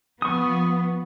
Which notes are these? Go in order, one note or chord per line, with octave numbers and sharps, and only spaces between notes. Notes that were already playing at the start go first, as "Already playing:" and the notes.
F3 B3 C#6 D#6